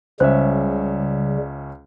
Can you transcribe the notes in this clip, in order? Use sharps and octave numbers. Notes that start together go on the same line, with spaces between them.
C#2 C#3 G3 C#4 C5 E5